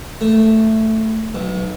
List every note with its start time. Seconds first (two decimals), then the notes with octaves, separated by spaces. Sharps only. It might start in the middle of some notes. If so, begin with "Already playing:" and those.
0.21 A3
1.35 B1